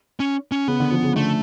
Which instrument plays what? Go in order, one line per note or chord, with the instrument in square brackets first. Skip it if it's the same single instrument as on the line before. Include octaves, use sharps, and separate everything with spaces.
[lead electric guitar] C#4
C#4
[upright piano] C#3 [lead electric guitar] B3
[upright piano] D3
F3
C#3
[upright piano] D3 [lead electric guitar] A3